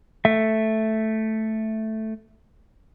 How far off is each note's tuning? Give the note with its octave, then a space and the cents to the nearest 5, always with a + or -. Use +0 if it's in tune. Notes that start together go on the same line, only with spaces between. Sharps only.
A3 +0 E5 +0